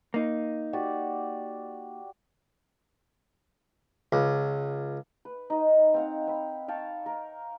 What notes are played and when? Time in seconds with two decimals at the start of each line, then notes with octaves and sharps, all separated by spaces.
0.14 A#3 D#4
0.73 F#4 G4 D5
4.12 C#2
5.25 B4
5.50 D#4 D#5
5.94 C4 F5 F#5
6.27 C4 B5
6.68 F5 G5 A5 C#6
7.06 A#4